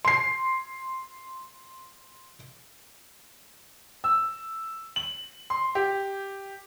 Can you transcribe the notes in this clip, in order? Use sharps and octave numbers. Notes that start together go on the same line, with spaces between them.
C6 C7
E6
F#7
C6
G4